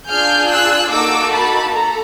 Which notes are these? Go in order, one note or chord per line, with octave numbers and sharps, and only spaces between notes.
D4 F4 G#4 F6 G6
E6 F#6
A#3 D#4 F#4 A4 D6 E6
A5 B5
A4 A#5